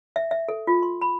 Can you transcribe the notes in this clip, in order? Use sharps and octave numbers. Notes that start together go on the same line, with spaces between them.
E5
E5
A4
F4
C6
B5